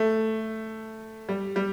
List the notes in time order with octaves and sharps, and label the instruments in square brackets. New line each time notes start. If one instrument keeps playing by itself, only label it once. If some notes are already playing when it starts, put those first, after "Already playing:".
Already playing: [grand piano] A3
G3
G3